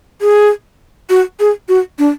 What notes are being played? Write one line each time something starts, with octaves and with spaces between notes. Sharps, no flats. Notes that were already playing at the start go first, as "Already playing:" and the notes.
G#4
F#4
G#4
F#4
D4